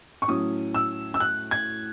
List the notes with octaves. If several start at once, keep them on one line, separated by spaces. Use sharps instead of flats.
C#6
A2 F#3 C#4 D#6
E6
E6
F#6
G#6